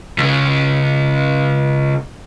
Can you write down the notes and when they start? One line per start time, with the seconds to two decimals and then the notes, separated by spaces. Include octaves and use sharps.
0.18 C#2 C#3